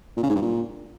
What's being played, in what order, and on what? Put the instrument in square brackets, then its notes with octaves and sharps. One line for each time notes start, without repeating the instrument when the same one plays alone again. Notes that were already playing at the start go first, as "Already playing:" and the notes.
[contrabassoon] A#2
C#3
G#2
G2
A#2